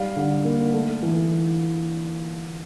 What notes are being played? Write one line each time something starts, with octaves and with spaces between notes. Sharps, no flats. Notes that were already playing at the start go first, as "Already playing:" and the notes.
Already playing: G3 F5
D3
A#3
A3
E3